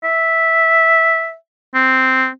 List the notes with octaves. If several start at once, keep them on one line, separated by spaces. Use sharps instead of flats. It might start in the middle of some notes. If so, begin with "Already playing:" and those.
E5
C4